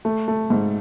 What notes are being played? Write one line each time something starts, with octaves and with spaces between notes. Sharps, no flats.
A3
A3
G#2